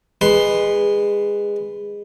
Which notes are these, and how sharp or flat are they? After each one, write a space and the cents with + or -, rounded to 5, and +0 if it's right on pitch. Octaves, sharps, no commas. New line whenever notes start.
G#3 -20 B4 +0 C6 +5